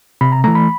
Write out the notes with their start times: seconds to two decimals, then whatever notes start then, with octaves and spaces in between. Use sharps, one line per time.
0.21 C3 B5
0.32 A#5
0.44 E3 A3 A#5
0.55 B5